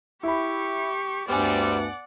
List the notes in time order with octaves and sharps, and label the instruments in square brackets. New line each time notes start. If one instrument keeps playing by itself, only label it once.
[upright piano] E4 B5 [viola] G4 C#6
[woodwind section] D2 G2 [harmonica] G3 C4 [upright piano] B3 G#5 [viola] D5 F#5